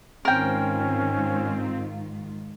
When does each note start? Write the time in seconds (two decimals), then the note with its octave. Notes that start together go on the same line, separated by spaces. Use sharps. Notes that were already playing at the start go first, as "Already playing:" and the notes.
0.25 G#2 D#3 C4 C#4 F4 A#4 G5